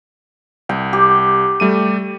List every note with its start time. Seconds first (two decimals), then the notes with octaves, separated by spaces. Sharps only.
0.69 C2 G5
0.93 G4
1.60 G3 A3 D#7